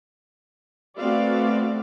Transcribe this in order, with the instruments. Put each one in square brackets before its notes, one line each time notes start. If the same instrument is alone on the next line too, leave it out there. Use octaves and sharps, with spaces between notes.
[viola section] A3 B3 C4 F#4 D5 F5